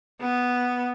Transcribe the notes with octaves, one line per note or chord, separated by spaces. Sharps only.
B3